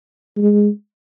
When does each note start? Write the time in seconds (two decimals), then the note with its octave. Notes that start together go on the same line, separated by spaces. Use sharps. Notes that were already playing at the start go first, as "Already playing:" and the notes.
0.37 G#3